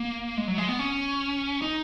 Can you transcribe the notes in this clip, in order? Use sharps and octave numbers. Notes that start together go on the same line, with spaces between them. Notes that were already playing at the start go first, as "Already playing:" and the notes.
Already playing: A#3
G#3
F#3
G#3
B3
C#4
D#4